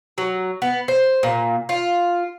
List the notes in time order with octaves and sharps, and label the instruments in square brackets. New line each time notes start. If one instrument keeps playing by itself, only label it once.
[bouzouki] F#3
B3
C5
A#2
F4